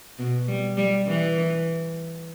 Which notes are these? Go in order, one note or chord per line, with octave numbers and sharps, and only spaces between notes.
B2
G3
G3
E3